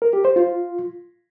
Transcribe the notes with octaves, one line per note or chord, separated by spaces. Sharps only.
A#4
G4
C5
F4